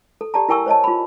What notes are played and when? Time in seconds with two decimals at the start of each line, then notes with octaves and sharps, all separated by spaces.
0.21 A4
0.34 G4 D5 A5 A#5
0.49 E4 A#4 G5 G#5 C#6 E6
0.66 C5 C#5 D#5 A5
0.84 F4 B5